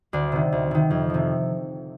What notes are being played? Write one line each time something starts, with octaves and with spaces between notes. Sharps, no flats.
D2 D4
C3 D#3
D2
C3 D#3
F2
C3 F3